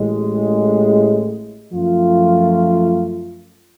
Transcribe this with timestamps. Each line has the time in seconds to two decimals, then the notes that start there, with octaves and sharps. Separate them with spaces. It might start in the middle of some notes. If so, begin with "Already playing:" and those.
Already playing: A1 A2 G#3
1.71 F#2 F3 A3 F4